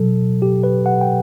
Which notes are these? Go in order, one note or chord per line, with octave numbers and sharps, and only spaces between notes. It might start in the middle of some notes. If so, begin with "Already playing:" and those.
Already playing: B2 F#3 A4
G4
B4
F#5
G5